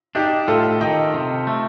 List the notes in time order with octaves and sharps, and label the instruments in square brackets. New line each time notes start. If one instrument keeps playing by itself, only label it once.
[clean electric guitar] D4 [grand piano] D#4 G4
[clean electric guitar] A2 [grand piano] F4 A4
[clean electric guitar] D#3 [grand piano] D#5 G5
[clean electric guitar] C3
A3